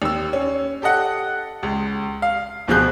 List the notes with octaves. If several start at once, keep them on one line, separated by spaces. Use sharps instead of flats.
D#2 E6
C#4
G4 A4 D#5 F#5
C#2
F5
D1 B2 F3 G#4 F#6 G6